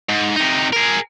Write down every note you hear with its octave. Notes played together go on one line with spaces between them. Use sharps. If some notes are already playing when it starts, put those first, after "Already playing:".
G#2
C3 D#4
G#4 A#4